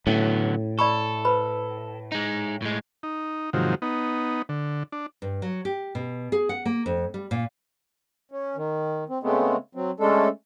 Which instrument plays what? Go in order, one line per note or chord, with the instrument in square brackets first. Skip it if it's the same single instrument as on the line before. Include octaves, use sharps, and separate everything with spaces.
[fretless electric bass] A2 [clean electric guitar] D3 F#3 B3 [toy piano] C#4
[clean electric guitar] A4 [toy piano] D5 B5 C#6
[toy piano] B4 C5 B5
[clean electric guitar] G#3 D#4
A2 G#3
[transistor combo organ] D#4
G#2 C3 D#3 F3 F#3
B3 D#4
D3
D4
[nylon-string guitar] G2
F#3
G4
B2
G#4
F#5
A#3
F2
G3
A#2
[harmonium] C#4
D#3
C4
C#3 G#3 A3 B3 C4
F#3 C4
G#3 A3 C#4 D4 A4